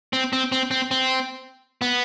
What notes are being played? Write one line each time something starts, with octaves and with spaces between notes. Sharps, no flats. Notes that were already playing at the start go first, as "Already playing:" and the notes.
C4
C4
C4
C4
C4
B3